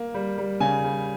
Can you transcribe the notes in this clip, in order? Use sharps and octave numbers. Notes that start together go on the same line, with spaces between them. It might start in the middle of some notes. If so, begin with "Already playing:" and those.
Already playing: A#3
G3
G3
C#3 G#5
G3